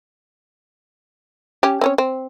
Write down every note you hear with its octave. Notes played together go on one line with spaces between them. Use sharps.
C#4 G4
C4 C#4 C#5
C4